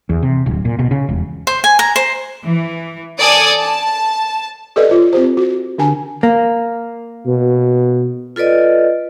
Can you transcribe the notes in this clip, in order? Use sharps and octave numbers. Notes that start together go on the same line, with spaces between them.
E2
C3
D1
A#2
B2
C#3
E1
C5
G#5
A#5
C5
E3
A4 D5 G#5 D#6
A5
G4 A4 B4 D5 D#5
F4 C#5
C4 G4 C5
F#4
D3 D4 G4 G#5 A5
A#3
B2
F4 A4 B4 D5 D#5